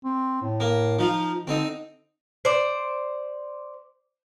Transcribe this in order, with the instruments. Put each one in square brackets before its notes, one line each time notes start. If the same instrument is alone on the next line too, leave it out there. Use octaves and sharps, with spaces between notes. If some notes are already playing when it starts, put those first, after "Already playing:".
[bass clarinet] C4
A2
[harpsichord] A#3
[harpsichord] F3 F4 [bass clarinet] D#4
[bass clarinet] D3 [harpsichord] C4 D#4
[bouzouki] C5 D5